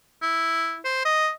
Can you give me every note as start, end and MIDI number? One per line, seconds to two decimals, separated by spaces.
0.22 0.78 64
0.85 1.04 72
1.05 1.30 75